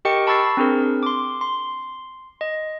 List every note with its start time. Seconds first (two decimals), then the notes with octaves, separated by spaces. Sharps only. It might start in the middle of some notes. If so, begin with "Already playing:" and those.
0.05 G4 A#4 D#5 G5 C#6 C#7
0.27 A5 B5 C#6 E6 A6 C7
0.57 C4 D4 G#4 A#4
1.03 C6 D6
1.41 C6
2.41 D#5